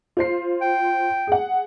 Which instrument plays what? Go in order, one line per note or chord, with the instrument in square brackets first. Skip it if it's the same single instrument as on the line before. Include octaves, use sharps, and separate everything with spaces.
[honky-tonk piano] F4 C5 C7
[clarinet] G5
[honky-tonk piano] G#4 F#5